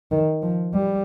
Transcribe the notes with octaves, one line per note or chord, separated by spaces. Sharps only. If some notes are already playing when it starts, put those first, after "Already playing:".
D#3
F3
G3